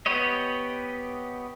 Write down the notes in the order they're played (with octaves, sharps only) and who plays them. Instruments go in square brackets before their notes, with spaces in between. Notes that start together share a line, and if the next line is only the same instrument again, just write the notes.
[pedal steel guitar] B3 G4 B4 C#5 D#5